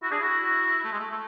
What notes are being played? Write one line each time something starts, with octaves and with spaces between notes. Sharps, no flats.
E4 F#4
D4 G#4
E4 F#4
F#4
A3
G#3
A3
A3